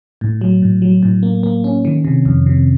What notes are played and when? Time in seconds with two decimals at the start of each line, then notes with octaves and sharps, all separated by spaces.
0.21 A2
0.41 F#3
0.62 A2
0.82 F#3
1.03 A2
1.23 A#3
1.43 A#3
1.64 C#4
1.85 D#3
2.05 C3
2.25 F2
2.46 C3